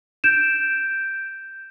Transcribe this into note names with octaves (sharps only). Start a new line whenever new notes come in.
G6 D7 E7